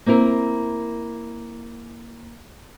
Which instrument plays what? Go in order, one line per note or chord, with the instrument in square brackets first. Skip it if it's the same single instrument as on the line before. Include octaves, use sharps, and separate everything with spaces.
[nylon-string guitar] A#3 C4 E4 A#4